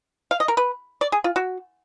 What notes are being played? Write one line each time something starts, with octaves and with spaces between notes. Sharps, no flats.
F5
D#5
A#4
B4
D5
G#4
F4
F#4